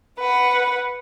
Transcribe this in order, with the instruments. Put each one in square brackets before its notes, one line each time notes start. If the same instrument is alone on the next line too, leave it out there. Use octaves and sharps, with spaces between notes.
[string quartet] B4 F#5